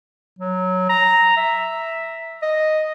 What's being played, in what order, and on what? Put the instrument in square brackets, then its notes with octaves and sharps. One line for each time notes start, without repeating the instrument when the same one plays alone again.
[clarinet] F#3
A#5
E5
D#5